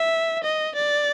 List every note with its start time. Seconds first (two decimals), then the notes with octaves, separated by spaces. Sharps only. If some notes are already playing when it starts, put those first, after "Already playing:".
Already playing: E5
0.43 D#5
0.75 D5